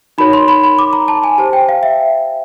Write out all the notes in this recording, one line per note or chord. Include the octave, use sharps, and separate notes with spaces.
D#4 F#4 A#4 C#5 B5
C6
B5
B5
D6
A#5
A5
G#5
G4 C5 A5
G5
F5
E5